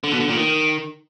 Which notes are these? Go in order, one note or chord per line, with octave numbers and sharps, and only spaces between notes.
D3
B2
D3
A#2
D#3